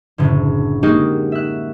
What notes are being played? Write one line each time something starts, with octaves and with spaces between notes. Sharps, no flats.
F#1 A2 D3
G#3 A#3 D#4 F#4 G4
E5 F#6